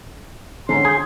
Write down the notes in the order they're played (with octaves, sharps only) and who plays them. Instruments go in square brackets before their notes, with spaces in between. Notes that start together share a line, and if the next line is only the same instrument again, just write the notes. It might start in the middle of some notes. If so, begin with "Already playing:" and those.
[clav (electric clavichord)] G#2 [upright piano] D3 C#4 [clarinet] C6
[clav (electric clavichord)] G#4 [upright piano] G6 G#6